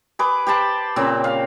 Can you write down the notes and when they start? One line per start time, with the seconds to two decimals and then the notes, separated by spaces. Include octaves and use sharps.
0.19 G#4 B4 D6
0.47 G4 C5 A5 B5
0.96 A#2 C#3 C4
1.24 F5